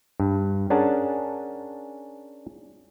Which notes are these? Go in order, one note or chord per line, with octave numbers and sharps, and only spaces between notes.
G2
C#4 D4 G#4 A#4 F#5 A5